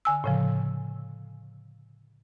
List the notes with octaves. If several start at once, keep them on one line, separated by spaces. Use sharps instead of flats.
D3 G#5 E6
A2 C#3 F3